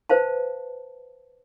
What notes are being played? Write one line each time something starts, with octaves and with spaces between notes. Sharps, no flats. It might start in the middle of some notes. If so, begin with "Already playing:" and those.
B4 C5 F5 A5